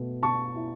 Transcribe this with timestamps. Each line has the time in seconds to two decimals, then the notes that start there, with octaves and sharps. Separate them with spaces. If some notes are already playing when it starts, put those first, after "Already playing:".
Already playing: B2 A3
0.23 B2 A5 C#6
0.56 E4